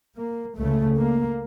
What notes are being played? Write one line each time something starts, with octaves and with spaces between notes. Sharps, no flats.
A#3
C#2 C#3 A3
A#3